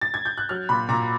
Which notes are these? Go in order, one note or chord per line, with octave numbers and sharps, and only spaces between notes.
A6
G#6
G6
F#6
F#3 F6
A#2 B5
A#2 A#5